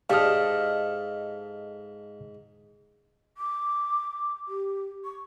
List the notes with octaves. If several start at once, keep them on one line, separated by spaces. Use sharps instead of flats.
G#2 G4 A4 D5 D#5 F5 F6
D6
G4
C#6